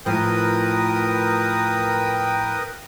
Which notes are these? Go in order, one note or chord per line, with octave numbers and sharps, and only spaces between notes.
A2 F3 A#4 B4 G5 D#6